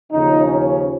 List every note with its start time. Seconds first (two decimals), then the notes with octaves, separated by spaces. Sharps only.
0.11 D#2 C#3 F3 D#4
0.44 C#4